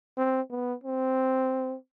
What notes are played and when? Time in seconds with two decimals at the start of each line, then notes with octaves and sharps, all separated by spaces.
0.18 C4
0.50 B3
0.84 C4